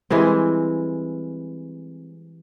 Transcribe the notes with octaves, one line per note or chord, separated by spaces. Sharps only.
E3 G3 G#3 C4